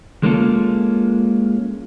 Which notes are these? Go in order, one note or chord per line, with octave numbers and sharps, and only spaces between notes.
G#3 A#3 C#4 F4 A4